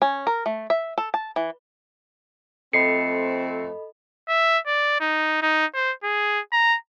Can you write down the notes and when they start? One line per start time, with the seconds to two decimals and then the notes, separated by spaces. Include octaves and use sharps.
0.02 C#4
0.27 A#4
0.46 A3
0.70 E5
0.98 A4
1.14 A5
1.36 E3
2.73 F2 A3 C4 A4 D#5 B5 C7 C#7
4.29 E5
4.67 D5
5.00 D#4
5.42 D#4
5.75 C5
6.03 G#4
6.52 A#5